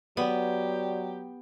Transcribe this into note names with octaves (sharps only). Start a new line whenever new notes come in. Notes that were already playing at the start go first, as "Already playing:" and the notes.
F#3 B3 G4 D5